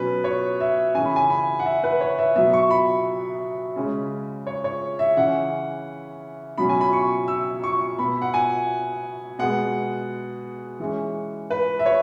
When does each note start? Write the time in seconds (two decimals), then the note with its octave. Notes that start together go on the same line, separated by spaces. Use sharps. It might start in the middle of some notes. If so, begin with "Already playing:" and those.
Already playing: B2 F#3 C#4 B4
0.24 C#5
0.60 E5
0.95 C#3 E3 C#4 G#5
1.05 B5
1.16 G#5
1.30 B5
1.59 F#5
1.66 E5
1.84 B4
2.01 C#5
2.18 E5
2.35 B2 F#3 B3 E5
2.53 C#6
2.71 B5
3.76 C#3 G#3 C#4
4.47 C#5
4.64 C#5
4.99 E5
5.17 C#3 E3 C#4 F#5
6.58 B2 F#3 C#4 B5
6.69 G#5
6.81 B5
6.93 C#6
7.28 E6
7.64 C#6
7.98 B2 B3 B5
8.22 F#5
8.34 G#5
9.39 B2 G#3 B3 F#5
10.80 E3 G#3 C#4
11.50 B4
11.79 E5
11.86 C#5